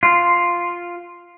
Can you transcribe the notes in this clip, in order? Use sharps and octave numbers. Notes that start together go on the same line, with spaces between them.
F4